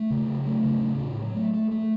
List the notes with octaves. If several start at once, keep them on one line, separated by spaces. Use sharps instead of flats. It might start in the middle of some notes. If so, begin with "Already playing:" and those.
Already playing: A3
C#3
F#3
A3
C#3
A2
A2
F#3
A3
A3
A3